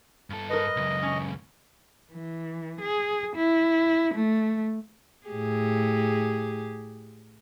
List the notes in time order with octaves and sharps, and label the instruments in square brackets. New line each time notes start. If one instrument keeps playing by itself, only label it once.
[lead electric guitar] G2 A4
[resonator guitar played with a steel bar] A#4 B4 [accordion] D#5
[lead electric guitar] C#2 F#2
[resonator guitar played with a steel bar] C#4
[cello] E3
G#4
E4
A3
[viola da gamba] A2 G4 G#4